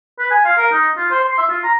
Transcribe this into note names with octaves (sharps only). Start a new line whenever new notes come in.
B4
G#5
F5
A#4
D#4
F4
C5
C6
E5
F4
A#5